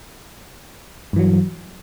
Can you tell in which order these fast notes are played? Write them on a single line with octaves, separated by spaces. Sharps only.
G2 E3 F#3